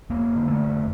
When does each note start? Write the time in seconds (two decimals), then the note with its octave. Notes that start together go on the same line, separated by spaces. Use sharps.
0.10 F1 A#3
0.36 D3
0.48 A3
0.60 F1